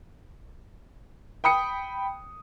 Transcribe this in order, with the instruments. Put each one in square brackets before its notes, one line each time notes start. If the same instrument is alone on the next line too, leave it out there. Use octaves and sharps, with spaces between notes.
[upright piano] G5 B5 D#6 C#7